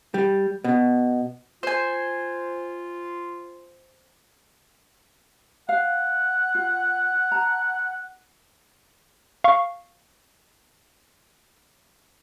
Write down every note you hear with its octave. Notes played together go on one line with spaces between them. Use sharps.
G3
B2
F4 C5 G#5
F5 F#5
F4
A5 A#5
F5 C#6